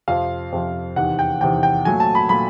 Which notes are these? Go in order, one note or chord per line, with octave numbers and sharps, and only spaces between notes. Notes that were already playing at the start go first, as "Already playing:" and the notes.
F2 C3 F3 F5
F2 C3 F3
E2 C3 D#3 F#5
G5
E2 C3 D#3 G5
G5
A#2 F#3 A3 G#5
A5
B5
A#2 F#3 A3 B5